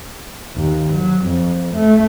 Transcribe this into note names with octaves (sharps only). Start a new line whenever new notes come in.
D#2
F#3
F2
A3